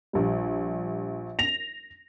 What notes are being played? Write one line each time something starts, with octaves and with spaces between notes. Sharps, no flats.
A#1 G3
A#6 F7